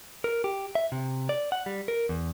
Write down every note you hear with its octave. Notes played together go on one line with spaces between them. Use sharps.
A#4
G4
E5
C3
D5
F#5
G3
A#4
E2